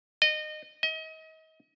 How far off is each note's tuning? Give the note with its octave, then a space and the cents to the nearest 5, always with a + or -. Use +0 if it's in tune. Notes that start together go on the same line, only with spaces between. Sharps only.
D#5 -25
D#5 +35